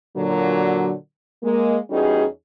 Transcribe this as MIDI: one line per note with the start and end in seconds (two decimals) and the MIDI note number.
0.17 0.93 46
0.17 0.93 50
0.17 0.93 54
1.43 1.78 56
1.43 1.78 58
1.91 2.25 40
1.91 2.25 55
1.91 2.25 61
1.91 2.25 63
1.91 2.25 66
1.91 2.25 68